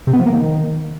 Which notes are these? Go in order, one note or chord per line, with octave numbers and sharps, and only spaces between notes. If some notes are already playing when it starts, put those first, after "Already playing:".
C3
B3
F3
A#3
D#3